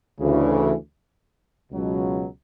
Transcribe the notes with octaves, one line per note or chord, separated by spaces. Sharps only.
D2 C#3 E3
C#2 B2 F#3